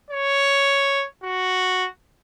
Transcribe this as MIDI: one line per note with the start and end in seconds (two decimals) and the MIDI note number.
0.10 1.05 73
1.24 1.87 66